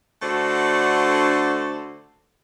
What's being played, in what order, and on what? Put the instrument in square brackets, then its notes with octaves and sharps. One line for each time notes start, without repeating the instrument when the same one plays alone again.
[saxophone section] D3 A3 D4 F#4 A4 C5